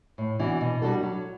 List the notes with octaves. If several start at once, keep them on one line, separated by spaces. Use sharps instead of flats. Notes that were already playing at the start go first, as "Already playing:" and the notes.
A2
E3 B3 D4 F#4
B2
G3 D4 F#4 A4
F#3